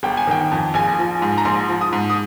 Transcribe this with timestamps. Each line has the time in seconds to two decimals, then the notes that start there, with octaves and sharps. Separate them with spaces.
0.03 G1 G5
0.17 G#5
0.27 D#3 G5
0.51 F2
0.74 A#1 G#5
0.99 F3
1.22 G#2
1.38 A#5
1.45 A#1 C6
1.69 F3
1.81 D#6
1.93 G#2
2.10 D#6